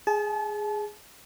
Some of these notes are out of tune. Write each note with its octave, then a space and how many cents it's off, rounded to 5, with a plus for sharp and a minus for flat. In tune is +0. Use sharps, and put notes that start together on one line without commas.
G#4 +0 A5 -35